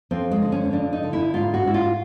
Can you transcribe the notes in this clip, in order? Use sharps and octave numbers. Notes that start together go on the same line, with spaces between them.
F2 C4
G#3
D3
C#4
F2 D4
D#4
D3
E4
G#2 F4
F#4
G#2 E4
F4